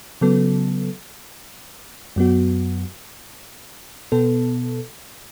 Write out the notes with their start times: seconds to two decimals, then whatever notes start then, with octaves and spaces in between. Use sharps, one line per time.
0.21 C#3 F#3 B3 A4
2.16 F#2 F#3 B3 F#4
4.12 B2 B3 A4